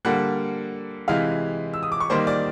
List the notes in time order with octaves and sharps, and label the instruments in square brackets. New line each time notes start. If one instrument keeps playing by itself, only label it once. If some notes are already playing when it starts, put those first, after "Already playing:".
[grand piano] D3 G3 A#3 F#5 F#6
C3 E3 G#3 F5 F6
E6
D#6
D6
C#6
D#3 G3 A#3 C5 C6
D5 D6